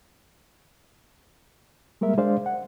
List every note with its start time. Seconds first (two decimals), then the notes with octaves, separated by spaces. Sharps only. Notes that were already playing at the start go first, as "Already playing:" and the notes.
2.01 G3 G#3 A#3 A#4 E5
2.18 G#3 D4 C5 D5 F5
2.46 F#5